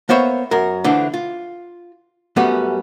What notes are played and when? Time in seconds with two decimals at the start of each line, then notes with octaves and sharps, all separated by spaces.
0.09 A#3 B3 C5 C#5 E5
0.51 F#2 A#4
0.84 D3 E3 F3 A3 D4
1.14 F4
2.36 F#2 G3 A3 B3 C#4